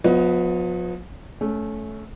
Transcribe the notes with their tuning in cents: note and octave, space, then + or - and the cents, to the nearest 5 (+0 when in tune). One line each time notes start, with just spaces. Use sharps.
F3 +40 B3 +0 D#5 +30
A3 -15 C#4 +10